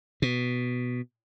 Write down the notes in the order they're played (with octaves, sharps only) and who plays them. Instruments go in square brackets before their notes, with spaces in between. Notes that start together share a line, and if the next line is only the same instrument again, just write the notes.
[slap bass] B2